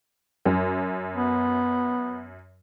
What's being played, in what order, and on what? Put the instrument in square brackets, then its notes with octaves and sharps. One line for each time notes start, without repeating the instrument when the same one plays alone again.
[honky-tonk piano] F#2
[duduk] B3